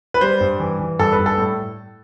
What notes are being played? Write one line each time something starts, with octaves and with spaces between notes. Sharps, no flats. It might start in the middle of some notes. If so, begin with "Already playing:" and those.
B4
G3 C5
G2
E3
E3
G2 A4
B4
G2
A4
A2